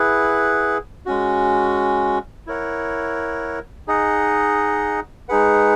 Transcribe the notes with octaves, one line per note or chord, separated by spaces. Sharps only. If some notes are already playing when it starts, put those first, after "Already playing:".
Already playing: E4 G#4 B4 F#5
G#3 C#4 F#4
E4 A#4 C#5 F#5
D#4 G#4 D#5 F#5
G#3 D#4 G#4 B4 F#5